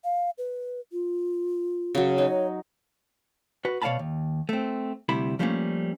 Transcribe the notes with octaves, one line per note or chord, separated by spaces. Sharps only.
F5
B4
F4
C#3 F#3
D#4 C#5
F#4 B4
B2 C#5 D5 F5 A5 B5
D#2
A3 C4
D2 C3 G3 E4 B5
F3 G3 A3 A#3 C4 C#4